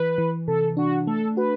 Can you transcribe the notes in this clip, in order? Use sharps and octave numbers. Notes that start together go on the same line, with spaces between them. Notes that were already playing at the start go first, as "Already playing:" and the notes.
Already playing: E3 B4
E3
C3 A4
D4 F#4
A3 A4
F#4 B4